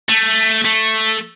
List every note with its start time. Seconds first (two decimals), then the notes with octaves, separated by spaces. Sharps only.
0.09 A3
0.65 A3